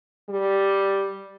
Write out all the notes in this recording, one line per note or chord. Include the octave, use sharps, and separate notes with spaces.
G3